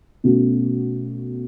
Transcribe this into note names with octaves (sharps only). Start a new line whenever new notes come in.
B2 A3 C#4 F#4